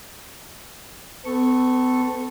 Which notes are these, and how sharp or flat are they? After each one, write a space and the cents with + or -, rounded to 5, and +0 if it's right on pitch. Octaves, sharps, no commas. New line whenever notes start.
B3 +45 A4 +0 C#6 -10